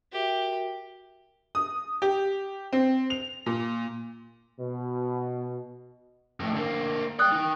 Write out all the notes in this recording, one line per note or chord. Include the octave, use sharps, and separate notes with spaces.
F#4 G4 A#4 E5
D#6
G4
C4
F7
A#2
B2
F2 A2
D3 A#3
D5 G5 D#6 F#6
D#4 G5